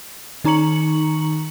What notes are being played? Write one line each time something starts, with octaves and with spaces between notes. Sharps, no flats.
D#3 D#4 A#5 C#6 C#7 F#7